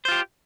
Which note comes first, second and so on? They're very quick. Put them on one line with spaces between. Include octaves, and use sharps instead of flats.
C5 F4 G4